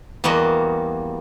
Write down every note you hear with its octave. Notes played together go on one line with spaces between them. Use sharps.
E2 G3 A#3 F#4 D#5